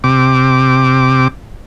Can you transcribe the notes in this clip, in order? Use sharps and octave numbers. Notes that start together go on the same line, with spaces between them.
C3 D6